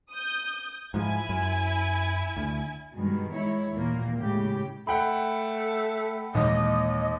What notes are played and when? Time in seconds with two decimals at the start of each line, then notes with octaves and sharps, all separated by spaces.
0.11 D#6 G6
0.94 G#2 F3 E4 G#5 G#6
1.29 F#2
2.37 D2
2.94 G2 B2 D#3 G#3
3.34 D#3 G#3 E4 C#5
3.72 D#2 A#2 E3 A#3
4.15 A2 C#3 G#3 G4
4.87 A3 F#5 G5 B5
6.35 D#2 A#2 E3 G#3 D#5